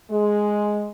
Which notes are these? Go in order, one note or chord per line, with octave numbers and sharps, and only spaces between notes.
G#3